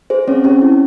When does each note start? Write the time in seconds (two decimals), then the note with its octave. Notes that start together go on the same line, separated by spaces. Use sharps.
0.10 G#4 C5
0.27 C4 C#4 C#5
0.44 C#4 G4 C#5
0.62 E4